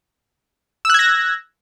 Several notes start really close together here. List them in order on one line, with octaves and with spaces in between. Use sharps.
E6 F#6 G#6 A#6